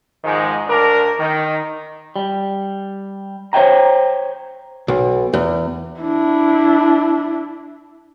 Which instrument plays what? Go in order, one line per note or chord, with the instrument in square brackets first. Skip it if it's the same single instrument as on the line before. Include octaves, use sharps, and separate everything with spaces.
[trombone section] G#2 D#3 F3 G#3
D2 D4 A#4
D#3
[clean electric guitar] G3
C5 C#5 E5 G5 A#5
[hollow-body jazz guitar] B1
E2
[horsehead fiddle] D4 E4